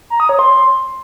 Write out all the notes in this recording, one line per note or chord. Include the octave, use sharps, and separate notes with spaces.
A#5
D#6
C#5
C6